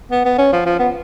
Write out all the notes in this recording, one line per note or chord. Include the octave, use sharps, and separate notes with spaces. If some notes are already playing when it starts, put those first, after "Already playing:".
B3
B3
C#4
F3
F3
B3